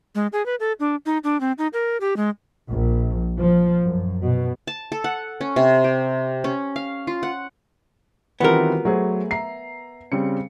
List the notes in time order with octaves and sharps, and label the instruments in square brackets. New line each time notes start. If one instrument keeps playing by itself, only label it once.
[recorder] G#3
G#4
B4
A4
D4
D#4
D4
C4
D#4
A#4
G4
G#3
[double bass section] A#1
F3
F#2
B2
[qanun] A5
A4
F#5
C#4
C3
G4
C#4
F5
F4
F#5
[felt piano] D#3 E3 C4 [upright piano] G3 F4 F#4 [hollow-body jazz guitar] B3 A#4
[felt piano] F#3 [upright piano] A3 G#4 C5
[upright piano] E5 A#5 [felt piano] C7
[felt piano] C#3 G3 C4 [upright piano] C#7